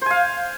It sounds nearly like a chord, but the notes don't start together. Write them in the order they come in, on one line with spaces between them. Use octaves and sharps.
C5 G#5 F5